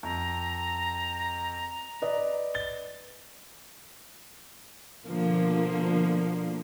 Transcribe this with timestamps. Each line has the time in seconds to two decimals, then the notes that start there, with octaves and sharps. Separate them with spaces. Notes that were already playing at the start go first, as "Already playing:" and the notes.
0.03 F2 A#5
2.02 B4 D5 D#5
2.54 A6 G7
5.07 B2 D3 F3 A#3